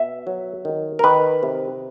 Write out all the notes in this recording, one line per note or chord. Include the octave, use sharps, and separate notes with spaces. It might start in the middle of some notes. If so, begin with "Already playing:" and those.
Already playing: B2 E5
F#3
D#3
A#4
D#3 B4
C3